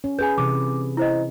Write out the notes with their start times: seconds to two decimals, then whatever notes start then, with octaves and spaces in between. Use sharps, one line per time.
0.04 C#4
0.19 G#4 B4 G#5 G6
0.38 C3 E3 D6
0.97 E4 C5 D#5